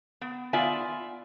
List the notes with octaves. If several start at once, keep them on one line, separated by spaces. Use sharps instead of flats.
B3
B3 F4 D5 E5 G#5